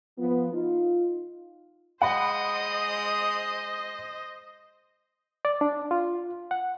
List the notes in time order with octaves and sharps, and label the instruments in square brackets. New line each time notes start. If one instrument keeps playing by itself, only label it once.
[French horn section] F3 B3 F4
D#4 F4
[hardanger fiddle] G#3 D#6 [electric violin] C5 D#5 [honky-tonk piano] F#5 B5
[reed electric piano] D5
D4
F4
F#5